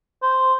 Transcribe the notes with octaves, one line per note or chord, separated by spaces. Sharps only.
C5